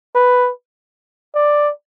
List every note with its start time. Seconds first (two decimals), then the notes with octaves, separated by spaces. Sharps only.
0.15 B4
1.35 D5